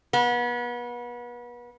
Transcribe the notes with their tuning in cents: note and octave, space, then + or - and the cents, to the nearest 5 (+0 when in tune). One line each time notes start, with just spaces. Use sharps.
B3 -35